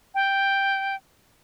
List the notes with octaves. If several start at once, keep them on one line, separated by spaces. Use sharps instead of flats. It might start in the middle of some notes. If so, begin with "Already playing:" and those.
G5